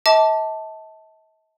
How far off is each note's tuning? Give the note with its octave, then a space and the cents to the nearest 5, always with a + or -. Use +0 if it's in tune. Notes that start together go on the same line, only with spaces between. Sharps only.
D#5 +45 A5 +0 D6 -10